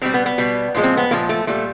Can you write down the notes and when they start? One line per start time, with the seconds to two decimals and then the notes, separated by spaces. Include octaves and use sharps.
0.02 B2 G3 C4
0.14 B3
0.26 B3
0.38 B2 G3
0.74 A#2 F3 G#3
0.83 C4
0.97 B3
1.11 A#2 F3 G#3 A#3
1.29 A3
1.47 A#2 G3 A3